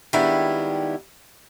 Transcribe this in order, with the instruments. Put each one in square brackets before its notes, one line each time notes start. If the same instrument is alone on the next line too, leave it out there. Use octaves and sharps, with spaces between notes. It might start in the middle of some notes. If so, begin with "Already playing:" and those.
[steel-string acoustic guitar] D#3 G3 G#3 B3 D4 E4